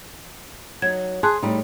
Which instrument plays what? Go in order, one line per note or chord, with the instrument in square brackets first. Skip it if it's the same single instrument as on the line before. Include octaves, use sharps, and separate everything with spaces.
[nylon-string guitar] F#3 D#4 [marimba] G#6
[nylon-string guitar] G#4 [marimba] A5 C6 F#6
[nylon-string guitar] A2 G3 D#4